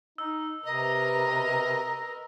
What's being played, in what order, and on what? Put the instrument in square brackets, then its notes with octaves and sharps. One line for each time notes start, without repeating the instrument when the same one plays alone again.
[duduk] D#4 [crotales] E6
[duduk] C3 [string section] A#4 B4 [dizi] D#5